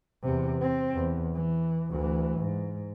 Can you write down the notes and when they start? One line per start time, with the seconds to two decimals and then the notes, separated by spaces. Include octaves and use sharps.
0.23 E2 C3
0.61 C4
0.94 E2
1.34 E3
1.90 D2 E3
2.39 G#2